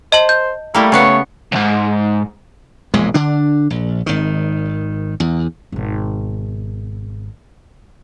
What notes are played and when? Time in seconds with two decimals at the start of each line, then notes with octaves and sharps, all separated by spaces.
0.12 C5 D#5 A5 F#7
0.29 G6
0.75 G3 A3 A#3 E4
0.92 C#3 B3 C#5 F#5
1.52 C2 G#2
2.94 E1 A#1 G#2 G#3
3.14 D3 D4
3.70 A#1
4.06 G#1 D#3
5.20 E2
5.72 G#1 B2